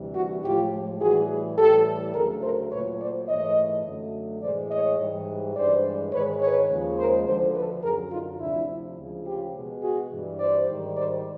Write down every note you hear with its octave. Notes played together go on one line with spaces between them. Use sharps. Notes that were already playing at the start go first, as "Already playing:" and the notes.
Already playing: D2 C3 E3 G3
E4 F#4
A2 F3 G#3 F4 G4
A2 E3 G3 F#4 G#4
A2 E3 G3 G4 A4
D2 C#3 F#3 A3 G#4 A#4
A#4 C5
A#2 F#3 A3 B4 C#5
C5 D5
G#2 E3 A3 C#5 D#5
F#2 D3 F#3 A3
A2 E3 G#3 C5 D5
C#5 D#5
G#2 E3 G3
G2 E3 G#3 C5 D5
G#2 D#3 G#3 B4 C#5
B4 C#5
D#2 C#3 F3 G#3
A#4 C5
D2 D3 F3 A3 A#4 C5
A4 B4
F#2 D3 F#3 G#4 A#4
D#4 F4
D2 C3 F3 D4 E4
D2 C#3 F3 G#3
F4 G4
B2 G#3
F#4 G#4
G2 E3 G3
C5 D5
G#2 D#3 G3
C5 D5